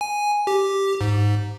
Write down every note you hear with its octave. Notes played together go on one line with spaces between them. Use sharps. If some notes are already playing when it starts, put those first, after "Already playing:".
G#5
G4
G#2